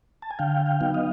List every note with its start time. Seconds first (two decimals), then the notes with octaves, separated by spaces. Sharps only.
0.22 A5
0.31 G#5
0.39 D3 F5 G5
0.66 F5 G5
0.80 F#3 B3 D#4
0.94 D#5 F5